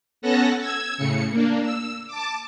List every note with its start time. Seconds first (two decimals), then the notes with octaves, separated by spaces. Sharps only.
0.22 B3 C#4 A4 F#5 A5 A#6
0.59 E6 G#6
0.96 A2 C#3 C#7
1.31 A#3 D4
1.63 E6
2.07 A5 D6